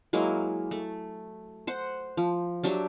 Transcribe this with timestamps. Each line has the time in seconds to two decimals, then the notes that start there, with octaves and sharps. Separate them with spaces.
0.13 F#3 G#3 A#3 E4
0.71 A3
1.67 C5 F#5
2.17 F3
2.63 F#3 D4 G4 E5